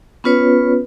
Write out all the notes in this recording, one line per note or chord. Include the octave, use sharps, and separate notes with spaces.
B3 C#4 F4 B4 C#5